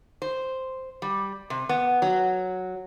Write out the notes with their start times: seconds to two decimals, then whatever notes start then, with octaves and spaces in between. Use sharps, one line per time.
0.22 C5
1.02 G3
1.50 C3
1.69 B3
2.02 F#3